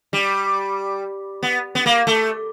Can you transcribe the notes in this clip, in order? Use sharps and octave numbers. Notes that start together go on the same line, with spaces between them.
G3
B3
B3
A#3
A3